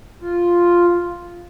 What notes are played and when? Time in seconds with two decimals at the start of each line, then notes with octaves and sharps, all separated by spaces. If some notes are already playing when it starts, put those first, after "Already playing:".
0.21 F4